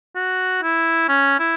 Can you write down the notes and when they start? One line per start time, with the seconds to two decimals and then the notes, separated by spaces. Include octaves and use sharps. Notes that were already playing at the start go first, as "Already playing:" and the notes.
0.16 F#4
0.63 E4
1.09 C#4
1.40 E4